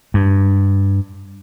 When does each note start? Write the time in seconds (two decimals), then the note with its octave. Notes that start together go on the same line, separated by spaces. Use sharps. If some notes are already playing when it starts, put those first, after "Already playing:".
0.14 G2